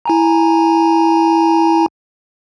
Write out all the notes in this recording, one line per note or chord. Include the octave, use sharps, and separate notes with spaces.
E4 G#5 A#5